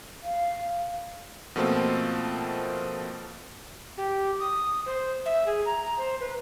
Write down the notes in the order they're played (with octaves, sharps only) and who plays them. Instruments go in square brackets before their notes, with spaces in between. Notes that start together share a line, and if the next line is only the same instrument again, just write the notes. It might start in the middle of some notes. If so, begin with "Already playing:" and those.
[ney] F5
[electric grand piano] B2 F3 A3 A#3 C4 F4
[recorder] G4
D#6
C5
E5
G#4
A#5
C5
B4